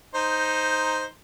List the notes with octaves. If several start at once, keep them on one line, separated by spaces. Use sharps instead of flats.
D#4 C5